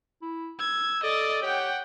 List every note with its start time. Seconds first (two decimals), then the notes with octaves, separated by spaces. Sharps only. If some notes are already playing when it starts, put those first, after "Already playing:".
0.22 E4
0.60 E6 G#6
1.04 A4 D5 D#5 A6
1.42 G4 C#5 F#5 G5